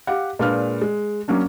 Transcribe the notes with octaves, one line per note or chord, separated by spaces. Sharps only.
G4 F5 F#5
A#2 G#3 D4 B4 F5 F6
G#3
F#3 A#3 C#4 D4